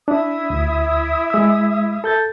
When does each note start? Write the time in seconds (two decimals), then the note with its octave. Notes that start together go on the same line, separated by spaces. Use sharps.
0.08 D4 E4 E5 D#6
0.50 D2
1.30 G#3 E6
2.04 A4 G6 A6